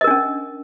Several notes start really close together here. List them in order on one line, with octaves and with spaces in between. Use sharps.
D#5 A#4 D4 C#4